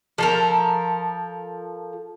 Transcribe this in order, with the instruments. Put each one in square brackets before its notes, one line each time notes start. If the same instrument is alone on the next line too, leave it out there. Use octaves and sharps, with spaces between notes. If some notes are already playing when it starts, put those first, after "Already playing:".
[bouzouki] F3 A4 A#4